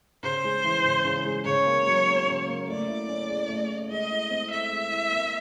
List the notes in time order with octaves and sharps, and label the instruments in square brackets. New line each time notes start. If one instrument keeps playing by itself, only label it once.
[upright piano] C#3 [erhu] C5
[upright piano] G#3
E3
C#3
C#3
G#3
[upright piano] C#3 [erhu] C#5
[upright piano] A#3
F#3
C#4
C#3
A#3
[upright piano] A3 [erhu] D5
[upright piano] E4
C#4
G#4
A3
E4
[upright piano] G#3 [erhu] D#5
[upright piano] E4
C4
[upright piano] A4 [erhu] E5
[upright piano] G#3
E4
A#3